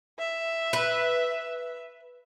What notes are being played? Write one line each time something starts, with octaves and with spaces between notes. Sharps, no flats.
E5
B4